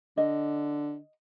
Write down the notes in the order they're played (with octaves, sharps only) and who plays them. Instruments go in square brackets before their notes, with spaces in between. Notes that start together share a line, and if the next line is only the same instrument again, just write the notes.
[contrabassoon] D3 [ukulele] D#5